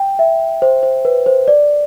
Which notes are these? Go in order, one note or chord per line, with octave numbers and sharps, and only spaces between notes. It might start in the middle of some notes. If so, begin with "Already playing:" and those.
Already playing: G5
E5
C5
C5
B4
C5
D5